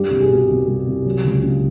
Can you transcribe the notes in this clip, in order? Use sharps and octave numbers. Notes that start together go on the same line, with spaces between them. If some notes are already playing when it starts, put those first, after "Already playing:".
Already playing: G2 G3 G4
C2
G#4
B2
C2
G3
C2
F#3
C#2
C#3